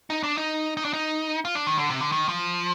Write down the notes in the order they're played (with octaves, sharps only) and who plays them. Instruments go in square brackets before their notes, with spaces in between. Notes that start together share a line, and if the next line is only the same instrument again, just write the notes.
[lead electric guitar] D#4
D4
D#4
D#4
D4
D#4
F4
D4
D#3
D3
C3
D3
D#3
F3